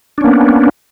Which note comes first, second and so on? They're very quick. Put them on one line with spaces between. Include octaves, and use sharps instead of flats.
D4 C#4 A#3 B3